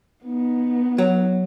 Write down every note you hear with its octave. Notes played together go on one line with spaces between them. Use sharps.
B3 D#4
F#3